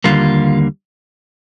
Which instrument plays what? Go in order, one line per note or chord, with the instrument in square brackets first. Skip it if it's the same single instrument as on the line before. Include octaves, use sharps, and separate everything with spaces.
[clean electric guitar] D#2 D3 G3 A#3 F4